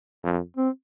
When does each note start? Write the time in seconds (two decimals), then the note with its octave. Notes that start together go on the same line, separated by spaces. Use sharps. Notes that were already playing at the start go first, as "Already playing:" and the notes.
0.24 F2
0.57 C4